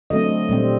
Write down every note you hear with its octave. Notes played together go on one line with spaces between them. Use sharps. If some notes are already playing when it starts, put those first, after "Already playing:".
D3 F#3 A3 C4 D#5
A#2 G3 C4